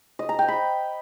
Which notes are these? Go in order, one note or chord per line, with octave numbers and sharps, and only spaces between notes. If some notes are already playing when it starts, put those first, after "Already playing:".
D#5
A#5
G5
B5